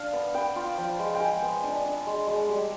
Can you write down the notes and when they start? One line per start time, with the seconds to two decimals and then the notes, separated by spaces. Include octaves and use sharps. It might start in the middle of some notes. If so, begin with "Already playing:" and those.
Already playing: D4 F5
0.13 B3
0.34 B3 G5
0.56 F4
0.78 F3
0.99 G#3
1.15 G5
1.20 G#3 G#5
1.42 B3
1.63 D4
1.85 D4
2.07 G#3
2.27 G#3
2.49 G3